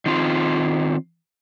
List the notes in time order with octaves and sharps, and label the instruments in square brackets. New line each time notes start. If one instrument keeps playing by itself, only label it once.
[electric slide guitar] D#3 C4 F4